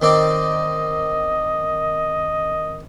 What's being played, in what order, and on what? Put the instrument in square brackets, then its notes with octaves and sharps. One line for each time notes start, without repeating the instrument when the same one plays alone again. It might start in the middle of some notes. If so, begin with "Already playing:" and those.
[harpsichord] D#3 C4 D5 [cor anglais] D#5